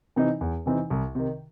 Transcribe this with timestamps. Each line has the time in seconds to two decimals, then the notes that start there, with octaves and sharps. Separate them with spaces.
0.16 C3 E3 C4 D#4
0.41 E2
0.66 C3 E3 C4 D#4
0.90 C2
1.15 C3 D#3